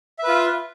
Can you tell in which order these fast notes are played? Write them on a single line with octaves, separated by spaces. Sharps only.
E5 B4 F4